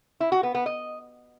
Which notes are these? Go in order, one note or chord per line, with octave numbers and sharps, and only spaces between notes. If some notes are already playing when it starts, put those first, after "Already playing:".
E4
F#4
B3
B3
D#5